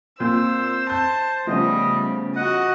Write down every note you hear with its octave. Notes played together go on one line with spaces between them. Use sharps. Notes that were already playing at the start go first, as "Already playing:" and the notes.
A#2 C4 C5 E6
A5 G6
C#3 F3 G3 A3 B3 C#4 D#5
F#4 D#5 F#5